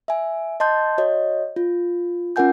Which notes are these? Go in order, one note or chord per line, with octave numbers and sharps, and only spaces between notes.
E5 G#5
D#5 A5 C6 G6
F#4 C#5 D#5
F4
C#4 F4 A#4 F#5 G#5 G6